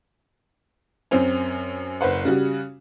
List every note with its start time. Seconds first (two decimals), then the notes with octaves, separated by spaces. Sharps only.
1.11 F#2 C4 C#4
2.01 F#1 B4 C5 F#5
2.25 C#3 G3 F#4